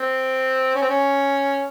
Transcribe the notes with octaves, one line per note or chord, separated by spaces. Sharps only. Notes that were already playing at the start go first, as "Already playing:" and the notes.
Already playing: C4
C#4
C4
C#4